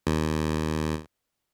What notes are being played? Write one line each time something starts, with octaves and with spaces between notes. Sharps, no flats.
D#2